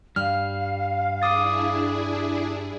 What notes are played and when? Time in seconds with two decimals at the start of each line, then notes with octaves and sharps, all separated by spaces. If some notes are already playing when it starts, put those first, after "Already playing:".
0.16 G2 G3 F5 F6
1.22 D4 E4 G#4 D6 D#6 A6